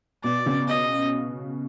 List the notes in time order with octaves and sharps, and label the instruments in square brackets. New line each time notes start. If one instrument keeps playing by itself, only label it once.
[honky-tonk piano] B2 [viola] D5
[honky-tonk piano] C#3
[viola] D#5